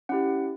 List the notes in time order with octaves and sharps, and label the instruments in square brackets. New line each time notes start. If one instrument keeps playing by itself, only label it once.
[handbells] C#4 E4 G4 F#5